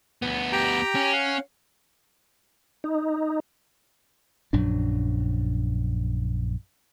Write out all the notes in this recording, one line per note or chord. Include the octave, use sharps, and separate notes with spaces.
D2 B3
G4 G5 A#5
C#4
F5 F#5
D#4
A#1 F#2 F#3 D4